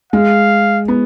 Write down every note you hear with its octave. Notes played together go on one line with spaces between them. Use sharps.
G#3 F5
B3